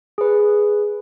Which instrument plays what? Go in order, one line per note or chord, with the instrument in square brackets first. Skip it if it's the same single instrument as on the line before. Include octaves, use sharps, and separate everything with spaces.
[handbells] G#4 B4